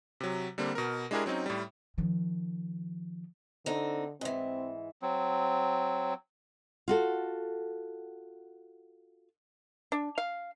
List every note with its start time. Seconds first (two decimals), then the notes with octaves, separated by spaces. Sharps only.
0.20 C3 F#3
0.58 D3 G3 A#3 C4
0.75 B2 A#4
1.11 G#3 D4 E4 G4 G#4 A#4
1.26 F#3 C4 C#4 D#4
1.46 A2 G3
1.98 D#3 F3
3.66 D3 C4 D#4
4.21 G#2 E3 C4
5.02 F#3 C4
6.88 F4 F#4 A4
9.92 D4
10.18 F5